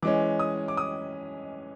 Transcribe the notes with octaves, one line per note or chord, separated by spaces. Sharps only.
E3 G#3 C#4 D6
D#6
D6
D#6